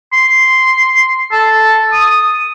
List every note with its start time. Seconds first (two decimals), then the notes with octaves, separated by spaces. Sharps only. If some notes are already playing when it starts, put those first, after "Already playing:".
0.13 C6
1.32 A4
1.92 D#6